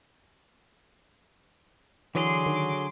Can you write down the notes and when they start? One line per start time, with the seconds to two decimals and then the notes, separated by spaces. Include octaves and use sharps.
2.15 D3 E3 F#3 G#4 C6 D6
2.46 D#3